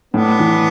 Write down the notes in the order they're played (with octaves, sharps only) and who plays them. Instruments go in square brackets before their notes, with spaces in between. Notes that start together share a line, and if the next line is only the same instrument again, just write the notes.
[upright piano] A2 [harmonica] B3 D4
[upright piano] E3